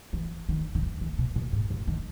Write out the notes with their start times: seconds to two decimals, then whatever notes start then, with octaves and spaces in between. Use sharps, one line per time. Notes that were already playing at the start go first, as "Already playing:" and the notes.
0.13 E3
0.49 D#3
0.75 D#3
0.83 E3
1.01 D#3
1.19 B2
1.36 A#2
1.53 G#2
1.70 F#2
1.87 D#3